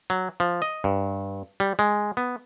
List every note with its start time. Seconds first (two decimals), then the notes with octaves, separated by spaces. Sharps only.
0.10 F#3
0.40 F3
0.62 D#5
0.84 G2
1.60 G3
1.79 G#3
2.17 B3